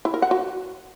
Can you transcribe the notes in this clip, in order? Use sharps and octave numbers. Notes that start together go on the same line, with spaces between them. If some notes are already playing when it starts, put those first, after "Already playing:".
E4
A#4
F#5
F#4